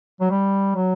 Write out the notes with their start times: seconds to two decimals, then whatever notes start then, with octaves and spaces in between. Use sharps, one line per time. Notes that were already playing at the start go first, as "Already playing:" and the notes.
0.21 F#3
0.31 G3
0.75 F#3